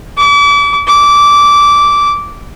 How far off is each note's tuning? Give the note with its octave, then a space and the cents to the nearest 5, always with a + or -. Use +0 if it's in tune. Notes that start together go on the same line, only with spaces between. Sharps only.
D6 -40
D6 -15